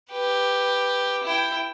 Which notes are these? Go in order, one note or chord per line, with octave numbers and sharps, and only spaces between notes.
G4 B4
E4 G5